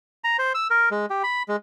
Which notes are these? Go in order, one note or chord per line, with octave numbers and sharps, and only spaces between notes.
A#5
C5
E6
A#4
G#3
G4
B5
G#3